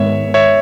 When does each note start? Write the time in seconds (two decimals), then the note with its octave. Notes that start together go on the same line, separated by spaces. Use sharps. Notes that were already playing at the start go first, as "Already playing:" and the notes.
Already playing: G#2 D#3 G#3 B3 C#5 E5
0.34 C#5 E5